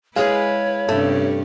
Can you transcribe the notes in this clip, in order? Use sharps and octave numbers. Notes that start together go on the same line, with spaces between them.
G#3 E4 G#4 B4 C#5 F5
G2 C3 A3 C#4